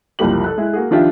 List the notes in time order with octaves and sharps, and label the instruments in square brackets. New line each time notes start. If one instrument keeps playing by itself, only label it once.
[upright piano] F#1 C2 F3 A#3 G4 F#7
A4 F#6
G#3 E4
A#3 F#4 G#4
D#3 F3 D4 F4 G4 E5